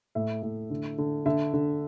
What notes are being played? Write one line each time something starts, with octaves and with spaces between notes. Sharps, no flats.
A2 E5
A2
D3
D3
D3 E5
D3